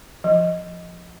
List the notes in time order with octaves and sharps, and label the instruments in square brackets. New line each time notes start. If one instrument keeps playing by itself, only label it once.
[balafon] F3